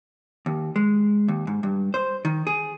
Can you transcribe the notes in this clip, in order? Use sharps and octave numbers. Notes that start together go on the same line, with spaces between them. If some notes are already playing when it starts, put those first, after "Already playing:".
D#2
G#3
D#2
G#2
G2
C5
D#3
G#4